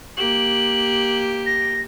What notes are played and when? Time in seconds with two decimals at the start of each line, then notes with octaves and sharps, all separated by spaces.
0.17 A#3 G4 F#7
1.46 A#6